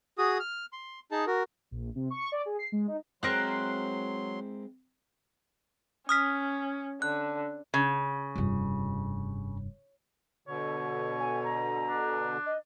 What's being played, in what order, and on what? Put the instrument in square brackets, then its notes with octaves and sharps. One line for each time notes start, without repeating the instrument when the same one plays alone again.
[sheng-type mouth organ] F#4 G#4 D#6
F6
C6
D#4 G#4 A5
F#4 A#4
[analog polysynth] A#1
C3
C#6
D5
G#4
C7
G#3
D#4
[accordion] F#3 C6 [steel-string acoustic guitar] G#3 C4 E4 [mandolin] A#4 C5 F#6
[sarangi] C#4 [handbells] D#6 F6 B6
[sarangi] D3 [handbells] F#6
[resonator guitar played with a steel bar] C#3
[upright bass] F1 G2
[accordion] B2 D3 [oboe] C#5
[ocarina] G#5
A#5
[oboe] D4
[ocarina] D#5